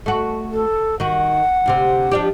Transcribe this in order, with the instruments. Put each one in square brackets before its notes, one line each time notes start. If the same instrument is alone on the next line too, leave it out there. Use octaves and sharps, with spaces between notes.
[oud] A3 F#4
[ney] A4
[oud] D#3 F#4 [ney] F#5
[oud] D2 C3 C4
F3 D4 G4